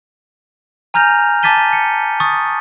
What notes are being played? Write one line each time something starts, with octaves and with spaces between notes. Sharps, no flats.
G#5 A#5 F6 G6 A#6 F7
A5 D6 A6 B6 D#7 G7
C#7
C#6 D#6 A6